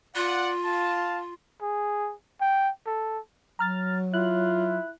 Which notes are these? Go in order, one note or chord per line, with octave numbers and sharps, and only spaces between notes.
F4 D5 F5 F#5
F5 A5
G#4
G5
A4
F#3 A#5 F6 A6
E4 F4 F#6